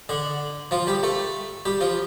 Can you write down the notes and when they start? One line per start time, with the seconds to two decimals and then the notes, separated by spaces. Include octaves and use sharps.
0.09 D3 D4
0.71 F3 F4
0.87 G3 G4
1.03 A3 A4
1.65 G3 G4
1.81 F3 F4